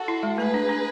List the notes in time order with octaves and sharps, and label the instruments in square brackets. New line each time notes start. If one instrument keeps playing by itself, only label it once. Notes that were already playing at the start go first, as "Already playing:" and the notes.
Already playing: [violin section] F#4 A4
[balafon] E4
G#3
[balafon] A3 [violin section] G#4 B4
[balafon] D4
D4